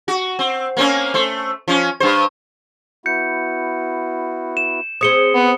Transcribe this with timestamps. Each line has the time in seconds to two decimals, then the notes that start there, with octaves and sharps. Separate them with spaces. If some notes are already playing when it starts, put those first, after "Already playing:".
0.08 F#4
0.39 C4
0.77 A#3 C4 C#4
1.14 A3 C5
1.68 F3 C#4
2.00 G2 C5
3.06 B3 E4 F#4 G6 C#7
4.57 E7
5.01 C4 G#4 C#5 D#6 C#7 G7
5.34 B3